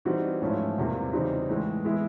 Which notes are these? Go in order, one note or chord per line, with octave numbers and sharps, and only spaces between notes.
E3 G3 C4 D#4 F#4
G#2 F3 A3 C#4 E4
E2 C3 E3 G3 A#3
C#3 E3 G3 C4 D#4
A2 E3 G#3
E3 G#3 B3 E4